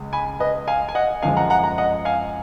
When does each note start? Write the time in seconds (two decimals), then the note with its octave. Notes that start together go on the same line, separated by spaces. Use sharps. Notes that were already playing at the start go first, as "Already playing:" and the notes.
Already playing: C#2 C#3 G#3
0.13 G#5 B5
0.40 B4 D#5
0.68 F5 G#5
0.89 G#5
0.95 D#5 F#5
1.22 F#2 F3 G#3 F5 G#5
1.37 F#5 A#5
1.50 F#5 A#5
1.64 F#5 A#5
1.78 D#5 F#5
2.05 F5 G#5